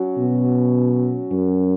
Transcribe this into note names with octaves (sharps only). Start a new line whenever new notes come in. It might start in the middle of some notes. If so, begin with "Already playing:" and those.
Already playing: F#3 C#4 F#4
B2
F#2